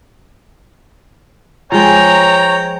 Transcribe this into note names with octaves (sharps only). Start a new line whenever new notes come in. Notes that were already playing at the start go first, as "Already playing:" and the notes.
F3 G#3 C#5 G5 A#5